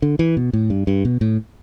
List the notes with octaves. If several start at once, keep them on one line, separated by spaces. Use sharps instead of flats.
D3
E3
B2
A2
G2
G2
B2
A2